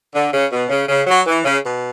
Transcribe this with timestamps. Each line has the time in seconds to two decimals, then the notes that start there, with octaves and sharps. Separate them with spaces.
0.14 D3
0.33 C#3
0.52 B2
0.69 C#3
0.89 C#3
1.07 F#3
1.26 E3
1.44 C#3
1.63 B2